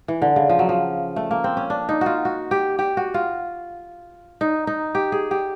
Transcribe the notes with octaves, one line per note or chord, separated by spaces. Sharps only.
E3
D3
C#3
F3
F#3
F3
A3
A#3
C4
C#4
D4
D#4
F4 F#4
F#4
G4
G4
F#4
F4
D#4
D#4
G4
G#4
G4